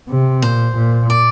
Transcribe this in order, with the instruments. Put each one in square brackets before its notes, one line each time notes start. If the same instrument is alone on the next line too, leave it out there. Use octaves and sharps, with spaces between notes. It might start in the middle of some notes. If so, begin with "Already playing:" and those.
[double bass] C3
[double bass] A#2 [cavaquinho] C5
[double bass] A#2
[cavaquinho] D5